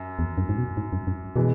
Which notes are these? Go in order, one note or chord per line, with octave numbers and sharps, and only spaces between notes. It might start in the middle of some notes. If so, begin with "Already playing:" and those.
Already playing: F#2
E2
F#2
G#2
B2
G#2
F#2
F#2
B2 E3 G#3